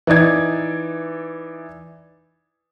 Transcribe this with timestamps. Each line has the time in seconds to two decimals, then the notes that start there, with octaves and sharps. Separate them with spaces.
0.07 E3 D#4 D5 G#6